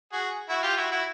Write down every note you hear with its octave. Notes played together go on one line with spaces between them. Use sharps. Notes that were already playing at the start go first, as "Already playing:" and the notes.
F#4 G#4
E4 F#4
F4 G4
E4 F#4
E4 F#4